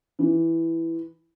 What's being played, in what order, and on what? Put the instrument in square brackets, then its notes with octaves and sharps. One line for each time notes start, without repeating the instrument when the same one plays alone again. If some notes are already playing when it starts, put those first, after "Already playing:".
[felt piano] E3